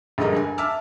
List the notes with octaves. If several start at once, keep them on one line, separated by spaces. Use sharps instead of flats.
A#1 G2 D3 G#3 A#4 D#5
G#5
E5 A5 D6 E6 F6